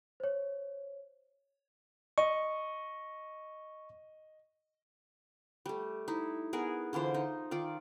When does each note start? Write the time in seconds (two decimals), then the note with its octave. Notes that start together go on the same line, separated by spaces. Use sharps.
0.20 C5 C#5
2.18 D#5 C#6
5.66 G3 A3
6.08 D#4 E4
6.53 B3 G#4 A#4
6.93 D3 E3 F4 C5
7.14 D#4
7.51 D#3 F4 D5